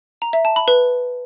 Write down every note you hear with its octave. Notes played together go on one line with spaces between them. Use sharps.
A#5
E5
A5
B5
B4